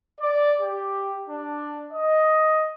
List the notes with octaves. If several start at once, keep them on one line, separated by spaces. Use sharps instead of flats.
D5
G4
D4
D#5